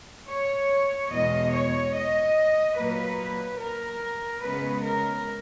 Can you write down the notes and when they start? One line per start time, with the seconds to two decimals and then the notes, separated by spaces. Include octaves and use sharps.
0.28 C#5
1.10 E2 B2 G#3 D#5
1.52 C#5
1.93 D#5
2.76 A#2 F#3 A#3 B4
3.59 A#4
4.41 C#3 G#3 B3 B4
4.83 A#4